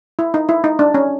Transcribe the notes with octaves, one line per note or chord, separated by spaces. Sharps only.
E4
D#4
E4
D#4
D4
C#4